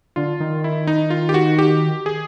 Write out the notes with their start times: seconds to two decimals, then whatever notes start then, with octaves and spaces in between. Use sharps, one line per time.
0.16 D3 F4
0.40 D#3
0.64 E4
0.87 D#4
1.10 F4
1.29 G4
1.34 F#4
1.59 G4
2.06 G#4